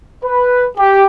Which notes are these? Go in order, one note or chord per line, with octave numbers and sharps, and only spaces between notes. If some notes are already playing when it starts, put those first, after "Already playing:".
B4
G4